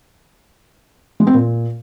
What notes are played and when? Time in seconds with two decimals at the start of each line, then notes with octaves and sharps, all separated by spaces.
1.20 G#3
1.27 C4
1.34 A#2